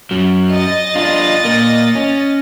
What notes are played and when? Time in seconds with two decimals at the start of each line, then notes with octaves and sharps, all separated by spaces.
0.11 F#2 F#3
0.55 D#5 A6 A#6
0.95 D4 F4
1.45 A#2 A#3
1.95 C#4